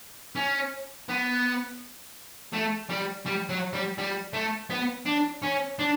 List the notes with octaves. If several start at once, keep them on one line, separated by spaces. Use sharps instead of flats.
C#4
B3
A3
G3
G3
F#3
G3
G3
A3
B3
D4
C#4
D4